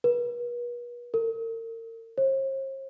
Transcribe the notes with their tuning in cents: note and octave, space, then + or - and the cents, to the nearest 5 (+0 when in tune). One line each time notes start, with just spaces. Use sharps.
B4 -40
A#4 -40
C5 +45